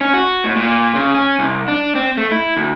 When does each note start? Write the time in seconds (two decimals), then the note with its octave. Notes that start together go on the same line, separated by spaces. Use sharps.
0.01 C#4
0.14 F#4
0.44 A2
0.56 A#2
0.95 C#3
1.14 C#4
1.39 C2
1.68 D4
1.95 C4
2.17 A3
2.32 E4
2.56 D2